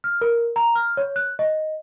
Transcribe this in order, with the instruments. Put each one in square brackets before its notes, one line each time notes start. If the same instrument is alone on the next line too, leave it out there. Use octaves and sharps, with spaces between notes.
[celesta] F6
A#4
A#5
F6
C#5
F#6
D#5